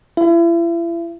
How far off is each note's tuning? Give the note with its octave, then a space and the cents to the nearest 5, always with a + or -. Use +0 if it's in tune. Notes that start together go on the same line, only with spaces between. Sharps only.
E4 +40